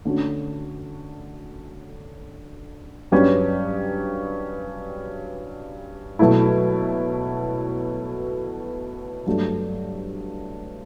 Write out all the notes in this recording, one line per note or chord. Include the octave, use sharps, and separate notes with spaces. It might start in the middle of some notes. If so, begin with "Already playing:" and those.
D3 A3 C#4 F#4
G2 F#3 C#4 G4 B4
B2 F#3 A3 E4
G2 F#3 A3